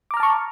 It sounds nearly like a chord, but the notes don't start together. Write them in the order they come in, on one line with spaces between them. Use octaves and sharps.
D6 A#5 F6 A5 C#6